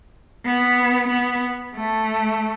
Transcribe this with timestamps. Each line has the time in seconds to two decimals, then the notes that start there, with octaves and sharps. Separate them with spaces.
0.45 B3
1.10 B3
1.76 A3